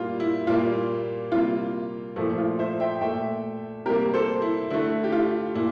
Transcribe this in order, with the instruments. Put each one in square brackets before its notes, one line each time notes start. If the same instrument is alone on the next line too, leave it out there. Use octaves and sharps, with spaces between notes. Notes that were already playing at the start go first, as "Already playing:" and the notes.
Already playing: [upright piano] A#2 G3 A#3 F4
E4
A#2 G3 A#3 F4
C3 G3 A#3 F4
A#2 F3 A3 E4
F4
C5 E5
E5 G5
A#2 A3 E5 G5
C3 G3 A#3 G4 A#4
A4 C5
E4
D3 A3 E4
G4
F4
A#2 E4